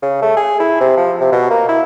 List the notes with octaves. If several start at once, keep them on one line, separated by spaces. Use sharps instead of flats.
C#3
A3
G#4
E4
C3
F3
C3
B2
A#3
E4